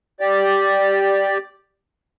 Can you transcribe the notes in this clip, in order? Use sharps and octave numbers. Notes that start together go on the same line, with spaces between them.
G4 D5